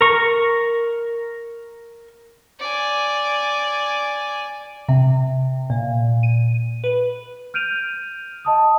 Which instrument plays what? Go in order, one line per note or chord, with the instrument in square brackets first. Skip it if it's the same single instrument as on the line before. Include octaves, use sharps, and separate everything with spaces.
[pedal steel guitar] A#4 C#6
[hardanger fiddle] D5 G#5
[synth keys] C3
A#2
D#7
B4
[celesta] F6 G6 D7 D#7 F7
D#5 A5 D#6